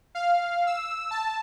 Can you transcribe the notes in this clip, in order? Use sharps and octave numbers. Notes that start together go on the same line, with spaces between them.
F5
E6
A5